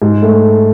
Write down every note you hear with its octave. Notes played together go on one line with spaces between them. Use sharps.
G#2
A3